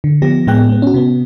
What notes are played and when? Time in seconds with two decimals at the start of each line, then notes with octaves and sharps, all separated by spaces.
0.04 D3
0.22 F3 B3 G4 A#6
0.47 A2 G#3 B3 G#4 G5 F#6
0.69 G#3 B3
0.82 C#4 F#4
0.94 C3 B3